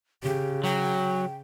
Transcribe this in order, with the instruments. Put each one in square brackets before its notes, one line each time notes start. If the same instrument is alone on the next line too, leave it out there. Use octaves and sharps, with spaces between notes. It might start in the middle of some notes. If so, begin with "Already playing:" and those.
[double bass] C#3 [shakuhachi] G4
[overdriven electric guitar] F#3 [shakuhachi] G5